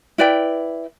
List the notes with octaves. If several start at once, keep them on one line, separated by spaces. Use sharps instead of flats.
E4 B4 D5 G5